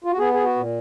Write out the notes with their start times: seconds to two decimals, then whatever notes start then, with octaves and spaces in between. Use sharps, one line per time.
0.04 F4
0.11 F#4
0.19 B3 G#4
0.33 G#4
0.44 F#4
0.56 A#2